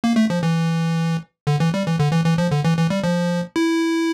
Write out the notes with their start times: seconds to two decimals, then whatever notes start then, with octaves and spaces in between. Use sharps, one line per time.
0.04 A#3
0.16 A3
0.30 F3
0.43 E3
1.47 D3
1.60 E3
1.74 G3
1.87 E3
1.99 D3
2.12 E3
2.25 E3
2.38 F3
2.51 D3
2.65 E3
2.77 E3
2.90 G3
3.04 F3
3.56 E4